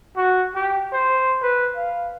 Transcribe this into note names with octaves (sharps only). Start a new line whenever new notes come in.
F#4
G4
C5
B4
F5